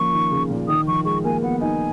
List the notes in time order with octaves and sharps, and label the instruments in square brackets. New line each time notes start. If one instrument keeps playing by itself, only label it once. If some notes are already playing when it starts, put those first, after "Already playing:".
Already playing: [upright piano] F3 A#3 C#4 [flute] C#6
[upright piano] D#3
C#3
A#2
[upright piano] D#3 [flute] D#6
[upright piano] F3 [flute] C#6
[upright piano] G#3 [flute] C#6
[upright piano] A#3 [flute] G#5
[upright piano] B3 [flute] F#5
[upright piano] D#4 [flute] G#5